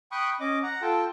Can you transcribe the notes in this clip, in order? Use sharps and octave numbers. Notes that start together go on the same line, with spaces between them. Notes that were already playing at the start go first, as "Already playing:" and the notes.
G5 B5 C#6 D#6 F#6
C#4 D#5 D6
F#5 A#5
F4 A4 G5 A5